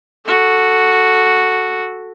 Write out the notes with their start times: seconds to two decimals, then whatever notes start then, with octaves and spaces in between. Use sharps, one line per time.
0.25 F#4 A4